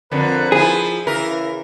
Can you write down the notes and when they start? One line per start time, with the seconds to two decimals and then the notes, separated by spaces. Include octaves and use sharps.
0.12 F2 D3 A#4 B4
0.52 F3 E4 G#4
1.07 C#3 E3 A#4